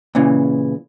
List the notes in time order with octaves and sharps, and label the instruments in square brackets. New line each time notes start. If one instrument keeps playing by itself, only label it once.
[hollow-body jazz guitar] A#2 C#3 E3